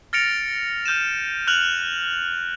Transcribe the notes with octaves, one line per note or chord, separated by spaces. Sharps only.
F6 A6 A#6 C#7 D7 F7
F6 G6 D#7 E7
F6 F#6 F7 F#7